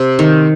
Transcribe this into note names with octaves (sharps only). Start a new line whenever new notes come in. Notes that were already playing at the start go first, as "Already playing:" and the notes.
Already playing: C3
D#3